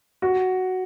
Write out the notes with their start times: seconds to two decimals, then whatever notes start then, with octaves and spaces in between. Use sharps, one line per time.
0.22 F#4